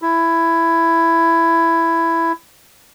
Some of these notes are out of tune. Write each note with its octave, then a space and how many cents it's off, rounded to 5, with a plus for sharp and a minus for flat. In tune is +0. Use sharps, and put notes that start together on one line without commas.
E4 +10